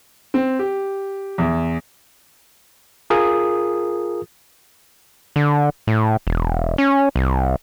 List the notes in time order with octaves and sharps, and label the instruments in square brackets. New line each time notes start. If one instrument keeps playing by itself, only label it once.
[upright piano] C4
G4
E2
[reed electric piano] F4 G#4 A#4 D#6
[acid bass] D3
A2
E1
C#4
C2